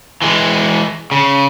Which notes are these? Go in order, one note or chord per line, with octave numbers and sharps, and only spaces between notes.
E3 G#3
C#3